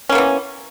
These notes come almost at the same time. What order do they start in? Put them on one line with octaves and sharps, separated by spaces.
C#4 A#3 B3 E3